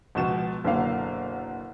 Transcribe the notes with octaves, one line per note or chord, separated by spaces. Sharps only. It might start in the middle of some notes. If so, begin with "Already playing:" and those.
C#2 B2 F3 E7
F#1 B2 D3 A#3 F5